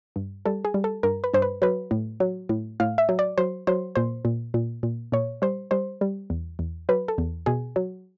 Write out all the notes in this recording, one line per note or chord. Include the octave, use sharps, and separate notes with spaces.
G2
G3 A4
G#4
G3
A4
G2 A#4
B4
G2 C5
B4
F#3 B4
A2
F#3
A2
A2 F5
E5
F#3
D5
F#3 C5
F#3 C5
A#2 C5
A#2
A#2
A#2
A#2 C#5
G3 C5
G3 C5
G3
E2
E2
F#3 B4
A4
E2
B2 G#4
F#3